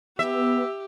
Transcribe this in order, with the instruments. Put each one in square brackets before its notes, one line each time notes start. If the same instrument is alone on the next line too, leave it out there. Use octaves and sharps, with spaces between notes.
[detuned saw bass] B3 [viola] G4 [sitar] E5